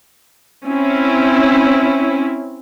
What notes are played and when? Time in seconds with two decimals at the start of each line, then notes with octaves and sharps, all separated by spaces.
0.66 C4 C#4 E4